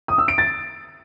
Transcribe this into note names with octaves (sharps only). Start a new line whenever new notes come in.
D#6
E6
D7
A6